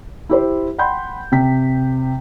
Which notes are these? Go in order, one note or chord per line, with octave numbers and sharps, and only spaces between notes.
E4 G4 C5
F#5 G5 B5 C6 G6
C3 C4 G5 B6